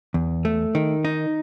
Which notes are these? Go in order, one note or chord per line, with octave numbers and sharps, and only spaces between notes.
E2
A3
D#3
D#4